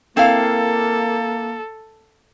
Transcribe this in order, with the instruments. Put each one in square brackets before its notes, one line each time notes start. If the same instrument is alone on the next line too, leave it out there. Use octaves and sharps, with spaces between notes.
[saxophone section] A#3 [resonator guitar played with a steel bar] C4 E4 F5 [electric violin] A4